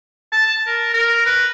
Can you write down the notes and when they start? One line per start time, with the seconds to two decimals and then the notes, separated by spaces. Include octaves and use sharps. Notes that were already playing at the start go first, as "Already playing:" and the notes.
0.32 A5
0.67 A#4
0.93 A#4
1.26 B4